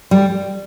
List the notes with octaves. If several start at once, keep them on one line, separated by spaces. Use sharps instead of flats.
G3